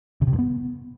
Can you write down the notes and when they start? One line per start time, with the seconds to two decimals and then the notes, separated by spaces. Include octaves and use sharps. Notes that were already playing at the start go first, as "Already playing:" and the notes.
0.22 C#3
0.27 C3
0.33 G2
0.39 B3